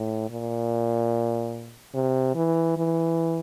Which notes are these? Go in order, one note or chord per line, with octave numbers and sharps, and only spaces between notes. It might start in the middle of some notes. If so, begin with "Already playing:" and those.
Already playing: A2
A#2
C3
E3
E3